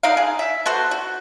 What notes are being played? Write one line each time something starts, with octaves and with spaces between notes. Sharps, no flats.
D3 D#4 A#4 F5
G#4
E5
B3 F#4 A4 C5
F#4